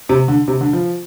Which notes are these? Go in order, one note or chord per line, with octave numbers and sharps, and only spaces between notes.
C3
D3
C3
D3
F3